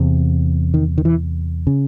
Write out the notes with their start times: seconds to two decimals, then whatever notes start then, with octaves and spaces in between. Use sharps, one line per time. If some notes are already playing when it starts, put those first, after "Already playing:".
Already playing: E2 C3
0.74 D#3
0.98 D#3
1.05 E3
1.67 C#3